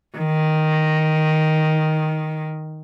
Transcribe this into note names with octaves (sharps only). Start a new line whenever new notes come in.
D#3